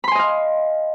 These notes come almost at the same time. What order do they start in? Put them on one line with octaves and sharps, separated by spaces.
B5 C6 G#5 D#5 F5